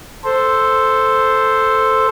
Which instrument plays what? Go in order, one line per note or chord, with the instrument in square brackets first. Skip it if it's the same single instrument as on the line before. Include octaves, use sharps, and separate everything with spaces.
[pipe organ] A4 C5